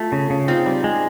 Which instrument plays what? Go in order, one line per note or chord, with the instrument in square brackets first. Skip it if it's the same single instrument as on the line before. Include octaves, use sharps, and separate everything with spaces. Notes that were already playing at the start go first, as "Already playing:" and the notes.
Already playing: [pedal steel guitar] A3 [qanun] F4
[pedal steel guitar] C#3
C#3
[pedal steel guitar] C4 [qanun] D#4 F4
[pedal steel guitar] G3
G#3